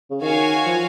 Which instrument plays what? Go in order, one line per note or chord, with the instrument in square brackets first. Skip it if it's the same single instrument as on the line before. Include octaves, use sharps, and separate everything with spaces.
[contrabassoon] C#3
[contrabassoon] D#3 [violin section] F#4 C#5 F5 G#5
[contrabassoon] F3